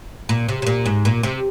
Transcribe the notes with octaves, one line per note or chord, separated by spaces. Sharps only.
A#2
C3
C3
A#2
G#2
A#2
C3